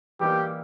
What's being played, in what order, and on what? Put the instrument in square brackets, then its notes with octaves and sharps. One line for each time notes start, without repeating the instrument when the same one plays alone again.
[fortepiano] E3 G3 A#3 D#4 [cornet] G4